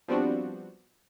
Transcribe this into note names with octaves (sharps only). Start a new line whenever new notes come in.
F3 G3 B3 C4 D4 F#4